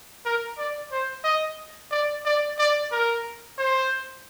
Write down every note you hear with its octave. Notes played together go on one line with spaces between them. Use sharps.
A#4
D5
C5
D#5
D5
D5
D5
A#4
C5